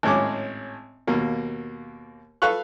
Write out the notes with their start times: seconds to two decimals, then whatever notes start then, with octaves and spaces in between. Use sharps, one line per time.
0.03 G#1 A2 G#3 C#4 D6
1.07 D#2 B2 A#3
2.42 A4 B4 F5 C#6 F#6